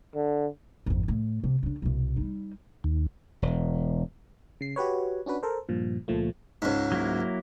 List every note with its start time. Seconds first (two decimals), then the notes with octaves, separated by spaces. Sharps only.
0.15 D3
0.86 G#1 F2
1.08 A2
1.44 C3
1.63 C#3 D4
1.82 C2 B2
2.16 G3 D#4
2.84 D#2
3.42 E1
4.61 C#3 C7
4.76 F#4 G4 B4 C#5
5.26 C#4 D4 F#4 B4
5.43 A4 A#4 C5
5.69 G2 A#2 F3
6.08 C#2 A#2 F3 A3
6.62 C#2 G#2
6.92 F#3 A#3 E4